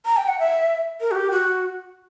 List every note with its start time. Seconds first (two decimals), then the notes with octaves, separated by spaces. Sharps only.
0.05 A#5
0.17 G5
0.28 F#5
0.39 E5
1.01 A#4
1.11 F#4
1.15 G4
1.31 F#4